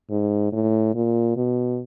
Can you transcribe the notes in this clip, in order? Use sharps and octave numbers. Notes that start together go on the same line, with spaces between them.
G#2
A2
A#2
B2